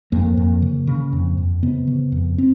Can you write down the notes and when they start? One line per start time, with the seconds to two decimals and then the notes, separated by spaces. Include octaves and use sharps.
0.12 F2 A#3
0.37 F2
0.62 C#3
0.87 C#3
1.13 F2
1.38 F2
1.63 C#3 B3
1.87 C#3
2.12 F2
2.38 C4